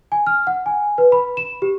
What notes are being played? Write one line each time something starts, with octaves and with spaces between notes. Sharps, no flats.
G#5
F6
F#5
G#5
B4
B5
E7
G4